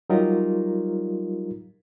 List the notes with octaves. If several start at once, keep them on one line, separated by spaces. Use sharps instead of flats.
F#3 G3 D#4 F4 G4 A#4